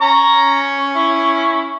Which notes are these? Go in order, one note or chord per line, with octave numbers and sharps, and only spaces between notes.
C#4 A#5 C#6
E4